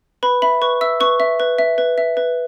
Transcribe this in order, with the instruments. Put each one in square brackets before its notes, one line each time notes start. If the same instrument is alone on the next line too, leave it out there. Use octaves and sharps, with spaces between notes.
[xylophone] B4 B5
E5 B5
B4 C#6
E5 E6
B4 C#6
E5
B4
E5
B4
E5
B4